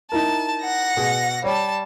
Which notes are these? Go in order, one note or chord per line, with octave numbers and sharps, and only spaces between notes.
D#4 E4 A#4 A5
F#5 A#6
B2 G#4
G3 C#5 A5